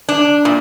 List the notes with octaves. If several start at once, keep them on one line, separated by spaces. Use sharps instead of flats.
D4
A#2